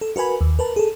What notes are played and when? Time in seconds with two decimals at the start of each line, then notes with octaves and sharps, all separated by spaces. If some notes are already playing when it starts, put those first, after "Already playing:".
0.01 A4
0.16 F#4 A#4 B4 G#5 B5
0.41 D#2
0.59 A#4 B4 A5
0.76 G#4 A4